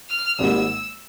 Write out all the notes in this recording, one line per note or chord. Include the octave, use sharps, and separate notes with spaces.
F6
G#1 G#2 G3 A#3 E6